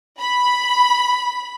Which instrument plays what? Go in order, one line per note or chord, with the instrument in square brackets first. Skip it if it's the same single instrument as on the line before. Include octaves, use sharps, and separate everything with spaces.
[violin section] B5